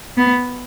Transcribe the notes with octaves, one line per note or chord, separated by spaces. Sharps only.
B3